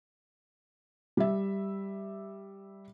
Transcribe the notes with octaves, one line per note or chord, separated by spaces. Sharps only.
G3 E5